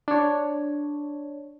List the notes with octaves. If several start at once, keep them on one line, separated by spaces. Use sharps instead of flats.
D4 C#5